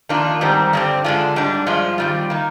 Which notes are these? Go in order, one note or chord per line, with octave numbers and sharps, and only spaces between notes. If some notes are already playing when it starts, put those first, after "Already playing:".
F2 D#3 A#3 D4 F4
G#2 D#3 G3 C4
G2 D3 G3 C4
D3 G#3 D4 F4
G#2 G3 D4
G2 F3 G#3 F4
D#3 G3 C4 F4
D#3 A#3